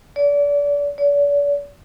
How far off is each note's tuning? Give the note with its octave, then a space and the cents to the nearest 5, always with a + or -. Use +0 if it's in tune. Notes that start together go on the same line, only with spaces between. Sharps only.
D5 -30
D5 -40